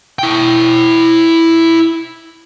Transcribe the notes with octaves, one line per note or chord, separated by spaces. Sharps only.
E4 G5